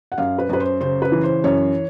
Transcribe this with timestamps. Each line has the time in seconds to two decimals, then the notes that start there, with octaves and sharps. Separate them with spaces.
0.12 F#5
0.18 F#2 F5
0.38 B4
0.49 F#2 B4
0.60 C5
0.81 C#3 C5
1.02 B4
1.12 E3
1.23 C5
1.44 F#2 C#5